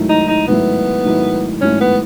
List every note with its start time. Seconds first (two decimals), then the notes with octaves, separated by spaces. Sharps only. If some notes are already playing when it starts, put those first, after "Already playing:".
Already playing: G#2 D#3 F#3 A3 E4
0.09 D#4
0.28 D#4
0.48 G#2 D#3 F#3 A3 B3 E4
1.04 G#2 D#3 F#3 A3 E4
1.61 G#2 D#3 F#3 A3 C#4 E4
1.81 B3